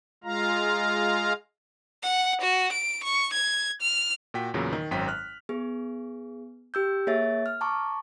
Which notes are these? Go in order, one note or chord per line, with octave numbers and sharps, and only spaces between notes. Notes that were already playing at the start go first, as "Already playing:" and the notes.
G#3 F4 F5 A#5
F#5
F#4
D7
C#6
G#6
F6
A#2 F#4 G5 B6
E2 A#2 C#3 F#3
D#3
G#1 F#2 F#3 C5 G5 B6
F6 F#6
B3 G#4
G4 E6 G6
A#3 G#4 C#5 E5 A6
F6
A5 A#5 C#6 D6